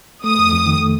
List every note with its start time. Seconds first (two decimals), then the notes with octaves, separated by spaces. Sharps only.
0.24 A3 D#6
0.39 F2
0.52 F2
0.66 D#3
0.80 A3